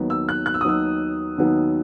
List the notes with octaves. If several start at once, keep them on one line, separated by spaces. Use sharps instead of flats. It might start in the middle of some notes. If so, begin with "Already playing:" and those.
Already playing: D#2 D#3 F#3 B3 D#4
E6
F#6
F#6
E6
D#6
D#2 D#3 F#3 B3 D#4 E6
D#2 D#3 F#3 B3 D#4